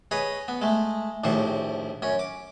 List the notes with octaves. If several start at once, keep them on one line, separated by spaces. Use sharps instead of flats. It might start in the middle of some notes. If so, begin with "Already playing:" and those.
G#4 B4 C#5 D#5
B3
G#3 A3
A#1 D#2 A2 C5 C#6
F#2 C#4
D6